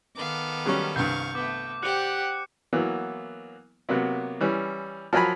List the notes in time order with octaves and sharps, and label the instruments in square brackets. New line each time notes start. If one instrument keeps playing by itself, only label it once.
[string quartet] D#3 B3 A4 [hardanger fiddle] F5 D6
[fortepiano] F#3 G3 C#4
[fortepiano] C2 G2 [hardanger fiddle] F5 C#6 [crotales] G6
[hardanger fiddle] A3 B3 [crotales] D6
[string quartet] G4 F#5 G5 [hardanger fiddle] C5 D5 [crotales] F#6 C#7
[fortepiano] E3 F#3 A#3 B3
C3 F#3 A#3 B3
E3 G3 C#4
F3 F#3 A#4 G#5 A#5 B5